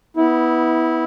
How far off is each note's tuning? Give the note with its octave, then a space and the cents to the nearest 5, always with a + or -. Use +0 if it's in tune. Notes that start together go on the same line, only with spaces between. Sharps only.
B3 +0 E4 -20